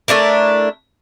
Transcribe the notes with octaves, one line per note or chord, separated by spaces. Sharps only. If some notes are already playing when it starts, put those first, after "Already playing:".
A3 D4 E4 A#4